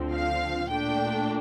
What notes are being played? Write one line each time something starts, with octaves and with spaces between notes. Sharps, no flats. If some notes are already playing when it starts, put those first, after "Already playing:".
Already playing: D2 D3 F3 C4
F5
A#2 A3 D4 G5